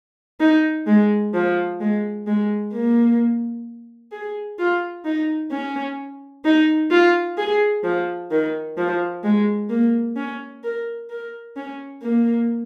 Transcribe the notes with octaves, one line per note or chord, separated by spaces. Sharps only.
D#4
G#3
F3
G#3
G#3
A#3
G#4
F4
D#4
C#4
D#4
F4
G#4
F3
D#3
F3
G#3
A#3
C#4
A#4
A#4
C#4
A#3